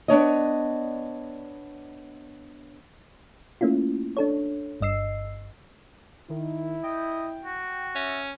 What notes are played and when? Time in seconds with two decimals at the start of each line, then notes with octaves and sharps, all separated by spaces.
0.08 B3 D4 C#5 D#5
3.61 A3 A#3 C#4 E4 F4
4.17 D4 A4 C#5
4.81 G1 G2 D#5 E6 C7
6.30 D#3 E4
6.84 D#5 G5
7.45 F#4
7.95 C#4 E5